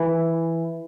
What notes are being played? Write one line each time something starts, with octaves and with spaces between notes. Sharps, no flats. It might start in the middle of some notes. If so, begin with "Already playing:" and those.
Already playing: E3